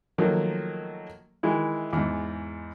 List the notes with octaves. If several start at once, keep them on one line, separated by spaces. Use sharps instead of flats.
D#3 F3 F#3 A3 A#3
D#3 E3 G#3 E4
E2 G#2